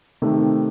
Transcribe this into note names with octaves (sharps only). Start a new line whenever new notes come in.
C3 D#3 A3